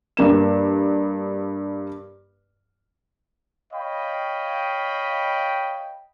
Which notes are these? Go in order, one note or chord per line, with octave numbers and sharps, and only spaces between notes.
G2 A#3 E7
C#5 D#5 F5 G5 B5